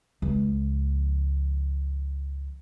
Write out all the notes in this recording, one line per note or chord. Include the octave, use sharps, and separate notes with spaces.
C#2 F3